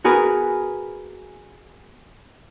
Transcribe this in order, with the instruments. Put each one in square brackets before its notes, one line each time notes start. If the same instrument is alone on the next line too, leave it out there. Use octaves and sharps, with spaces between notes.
[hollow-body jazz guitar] B3 F#4 G#4 A#4 B4